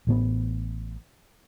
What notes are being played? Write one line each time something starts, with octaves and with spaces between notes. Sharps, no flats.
A1 A2 B3